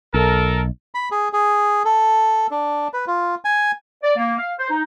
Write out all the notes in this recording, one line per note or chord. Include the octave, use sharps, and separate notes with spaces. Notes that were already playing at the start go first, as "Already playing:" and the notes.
B1 A4 A#4
B5
G#4
G#4
A4
D4
B4
F4
G#5
D5
A#3
F5
C5
D#4